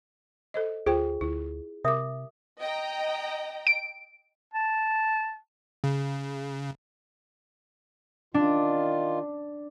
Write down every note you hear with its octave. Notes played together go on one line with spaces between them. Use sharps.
A4 C5 D#5
D2 F4 G#4 C5 G5
D2 E4
C3 G4 A#4 E5 D6 D#6
D#5 G5 A#5
D7
A5
C#3
D#3 D4 F4